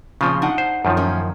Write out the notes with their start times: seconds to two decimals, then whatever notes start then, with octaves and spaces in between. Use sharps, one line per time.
0.21 A#2 C#3 F3 C4
0.42 D4 D#4 F#5
0.58 C5
0.85 F#2 D#3 F3
0.97 A2 A#3 C#4